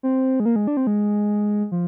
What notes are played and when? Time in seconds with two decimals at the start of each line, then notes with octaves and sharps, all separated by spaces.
0.03 C4
0.40 G#3
0.46 A#3
0.56 G#3
0.67 D4
0.77 C4
0.87 G#3
1.72 F3